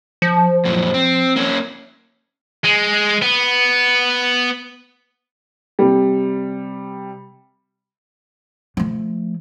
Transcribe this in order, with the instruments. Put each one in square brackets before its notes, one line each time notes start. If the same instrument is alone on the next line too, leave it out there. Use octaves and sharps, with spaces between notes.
[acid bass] F3
[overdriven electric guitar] F#2 A#2
C4
A#3 C#4
[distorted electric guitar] G#3
B3
[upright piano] C3 G3
[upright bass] F3 A3